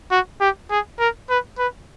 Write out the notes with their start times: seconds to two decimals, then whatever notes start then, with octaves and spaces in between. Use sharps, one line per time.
0.11 F#4
0.40 G4
0.70 G#4
0.99 A#4
1.30 B4
1.58 B4